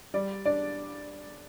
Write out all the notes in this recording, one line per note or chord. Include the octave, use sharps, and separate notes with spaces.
G3 D5
D4 D5